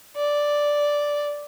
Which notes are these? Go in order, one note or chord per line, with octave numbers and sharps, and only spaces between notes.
D5